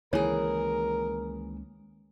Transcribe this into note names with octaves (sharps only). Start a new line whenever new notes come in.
C#2 D#3 E3 A#3 G#4 A#4 C#5